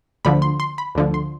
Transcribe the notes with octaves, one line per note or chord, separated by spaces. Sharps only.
D2 D3 F3 B5
C6
C6
B5
D2 D3 F3
C6